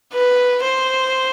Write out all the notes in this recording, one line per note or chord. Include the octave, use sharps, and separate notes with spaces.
B4
C5